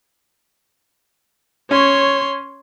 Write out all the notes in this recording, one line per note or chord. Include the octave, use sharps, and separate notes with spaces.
C#4 C#5 C6